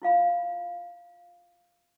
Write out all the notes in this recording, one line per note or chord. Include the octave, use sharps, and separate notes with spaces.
E4 F4 F5 B5